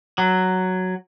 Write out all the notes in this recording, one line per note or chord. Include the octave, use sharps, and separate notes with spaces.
F#3